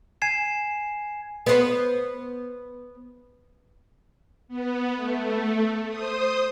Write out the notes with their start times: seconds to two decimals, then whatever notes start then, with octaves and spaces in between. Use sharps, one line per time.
0.22 G#5 G#6 C7 E7
1.46 B3 C5
4.48 B3
4.96 A3
5.88 C5 D#6